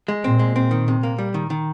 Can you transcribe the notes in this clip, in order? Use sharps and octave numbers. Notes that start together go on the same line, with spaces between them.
G#3
A#2 C4
G#3
C4
D#3
C3
A#3
G3
D#3
D#3